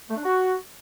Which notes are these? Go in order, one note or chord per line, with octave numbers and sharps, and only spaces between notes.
A3
D4
F#4